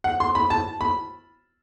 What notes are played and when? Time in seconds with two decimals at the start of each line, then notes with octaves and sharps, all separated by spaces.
0.04 F#5
0.20 C6
0.35 B5
0.50 A5
0.81 B5